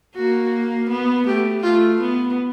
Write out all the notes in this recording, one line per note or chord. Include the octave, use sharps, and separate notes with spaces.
A#3 F#4
B3
A3 G4
A3 F4
B3